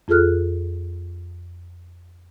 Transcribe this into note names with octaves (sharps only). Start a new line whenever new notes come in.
F2 F4 G#4 A4 F6 F#6